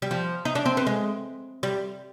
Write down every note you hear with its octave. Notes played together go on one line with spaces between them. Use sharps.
G3
F3
D#4
D4
C4
B3
G#3
G3